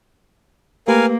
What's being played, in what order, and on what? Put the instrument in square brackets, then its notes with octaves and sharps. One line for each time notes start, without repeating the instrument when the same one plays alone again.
[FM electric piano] A3 G4 B4 [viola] A#3 [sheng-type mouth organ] A#4 F5 G#5